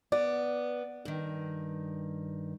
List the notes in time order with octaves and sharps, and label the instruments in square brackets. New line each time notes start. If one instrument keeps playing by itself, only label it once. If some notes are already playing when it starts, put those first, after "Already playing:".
[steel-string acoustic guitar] B3 [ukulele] D5
[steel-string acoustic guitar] G2 D#3